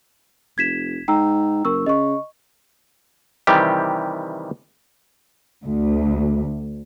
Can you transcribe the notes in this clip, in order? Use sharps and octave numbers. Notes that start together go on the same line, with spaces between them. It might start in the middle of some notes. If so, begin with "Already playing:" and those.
F1 G#6 B6 E7
G#2 G5 A#5 E6
F#1 A#4 C#6 E6
C#3 D#5 C#6
C3 D#3 E3 G3 G4
D2